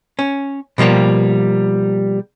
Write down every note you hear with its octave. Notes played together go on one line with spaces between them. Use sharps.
C#4
B2 F3 G3 A#3 G4